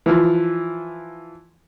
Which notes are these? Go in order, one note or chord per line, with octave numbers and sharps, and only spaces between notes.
E3 F3